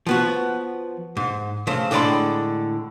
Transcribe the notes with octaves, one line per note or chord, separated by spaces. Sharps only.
F3 B3 F#4
G#2
C#3 A3 C5
A2 D3 G#3 D5 B5 C6